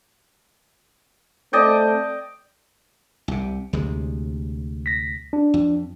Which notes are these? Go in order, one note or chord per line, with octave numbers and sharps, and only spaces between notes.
A3 C4 A4 D5 D#5 G5
C2 C3
D2 C3 G#3
A#6 B6
D4
F2